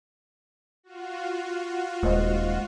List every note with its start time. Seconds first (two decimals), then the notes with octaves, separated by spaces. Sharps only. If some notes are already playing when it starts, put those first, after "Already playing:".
0.83 F4 F#4
2.03 D#1 G#3 C5 D#5